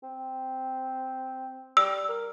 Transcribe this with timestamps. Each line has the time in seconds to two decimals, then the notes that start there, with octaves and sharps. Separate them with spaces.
0.03 C4
1.77 G3 E6
2.09 A#4